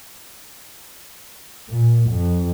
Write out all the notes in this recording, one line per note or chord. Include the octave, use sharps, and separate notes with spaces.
A#2
F2